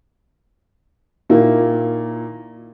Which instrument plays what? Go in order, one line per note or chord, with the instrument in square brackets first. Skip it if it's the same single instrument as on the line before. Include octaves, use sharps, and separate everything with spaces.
[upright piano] A#2 D#3 A#3 E4